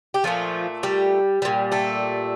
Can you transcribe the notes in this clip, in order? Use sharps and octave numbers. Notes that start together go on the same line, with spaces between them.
G4
A#2 F3 A3 F4
G3 G4
A#2 G3
A3 A4